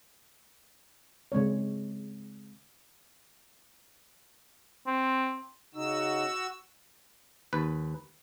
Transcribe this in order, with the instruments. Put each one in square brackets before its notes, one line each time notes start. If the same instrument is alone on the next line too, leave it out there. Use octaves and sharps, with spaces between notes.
[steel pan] C#3 G#3 C4 C#5
[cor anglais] C4
[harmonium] C#3 D#4 [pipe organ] F#4 E6
[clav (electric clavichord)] D#2 B4